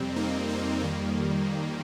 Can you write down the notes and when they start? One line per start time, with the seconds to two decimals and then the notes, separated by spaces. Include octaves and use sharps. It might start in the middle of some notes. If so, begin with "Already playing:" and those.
Already playing: F2 C3 G3 C4
0.16 A#3 D#4
0.49 C4
0.80 F2 D#3 G3 A#3